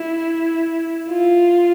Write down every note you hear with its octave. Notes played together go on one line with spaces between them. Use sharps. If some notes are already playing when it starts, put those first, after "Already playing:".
Already playing: E4
F4